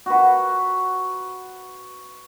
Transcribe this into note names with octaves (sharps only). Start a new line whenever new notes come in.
F#4 B4